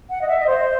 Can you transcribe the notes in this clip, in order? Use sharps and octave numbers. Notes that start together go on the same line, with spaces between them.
F#5
D#5
E5
D#5
C5